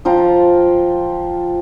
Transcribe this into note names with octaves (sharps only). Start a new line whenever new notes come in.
F3 F4 G5 A#5